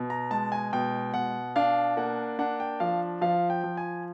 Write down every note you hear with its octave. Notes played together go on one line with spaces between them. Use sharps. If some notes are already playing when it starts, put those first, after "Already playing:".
Already playing: B2
A#5
G#3 A5
G#5
B2 G5
B2 F#5
D4 F5
A#3 F#5
D4 F#5
G5
F3 F5
F3 F5
G5
F3
G#5